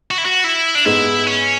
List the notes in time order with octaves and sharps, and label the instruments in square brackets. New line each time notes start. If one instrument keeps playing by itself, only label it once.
[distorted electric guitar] F#4
E4
F#4
E4
D4
[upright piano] G#2 G#3 B3 [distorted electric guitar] E4
[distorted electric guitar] C#4